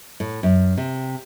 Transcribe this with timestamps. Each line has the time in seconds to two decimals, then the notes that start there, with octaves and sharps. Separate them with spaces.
0.20 A2
0.43 F#2
0.77 C3